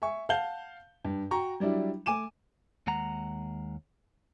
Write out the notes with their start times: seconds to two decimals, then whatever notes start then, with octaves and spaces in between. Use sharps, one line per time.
0.02 E5 G#5 C#6
0.29 F5 F#5 A5 G6 G7
1.05 G2
1.31 F#4 G5 A#5 C#6
1.60 F#3 G3 D4 E4
2.06 A3 G#5 D6 D#7 E7
2.87 D#2 G#3 F#5 A#5